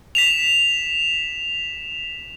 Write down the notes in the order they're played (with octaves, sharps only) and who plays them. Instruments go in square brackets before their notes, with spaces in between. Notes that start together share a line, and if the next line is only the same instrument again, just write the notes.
[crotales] B6 E7 F7